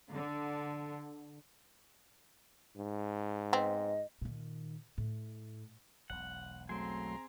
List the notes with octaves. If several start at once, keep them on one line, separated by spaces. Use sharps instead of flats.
D3
G#2
B3 C4 D#5
A#2 D#3
A2
E1 B1 F#5
F#3 A3 C4 G#4 A#5 C6